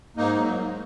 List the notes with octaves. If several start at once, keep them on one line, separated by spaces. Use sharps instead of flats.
G#2 A#3 D#4
F#3 A#3
G#2